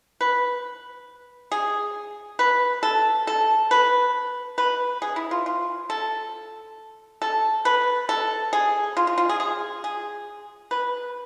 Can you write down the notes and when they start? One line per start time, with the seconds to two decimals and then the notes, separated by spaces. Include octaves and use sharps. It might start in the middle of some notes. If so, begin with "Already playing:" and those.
0.21 B4
1.52 G#4
2.39 B4
2.83 A4
3.27 A4
3.71 B4
4.58 B4
5.02 G#4
5.16 E4
5.31 F4
5.46 F4
5.90 A4
7.22 A4
7.65 B4
8.09 A4
8.53 G#4
8.97 F4
9.07 F4
9.18 F4
9.29 G#4
9.40 G#4
9.84 G#4
10.71 B4